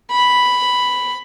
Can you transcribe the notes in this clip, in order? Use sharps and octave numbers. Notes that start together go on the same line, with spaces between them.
B5